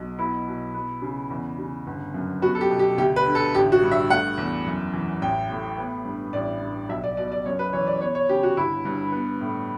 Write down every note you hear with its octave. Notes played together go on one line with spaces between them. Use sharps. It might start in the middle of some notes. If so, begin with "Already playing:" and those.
Already playing: B1 B2
B3 E4
B2
B3
C#3
E2
C#3
G1
F#2
B3 F#4
A4
G4
B2
G4
D2 G4
B4
D3
A4
A1 G4
F#4
G2
E5
A3 F#5
E2
F#2
E3
A1 G5
A2
B3
G2
A1 D5
G2
B1 E5
D5
B2 D5
D5
F#2 C#5
B4
E3 C#5
D5
B3 C#5
C#5
C#3 G4
F#4
G1 E4
G2
B3
A2